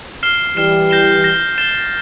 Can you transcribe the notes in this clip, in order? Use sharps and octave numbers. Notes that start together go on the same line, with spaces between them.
F6 C7 E7 G7
E3 G3 F6 C7 E7 G7
G6 A#6 E7 G7
G6 A#6 E7 G7
A6 E7 G7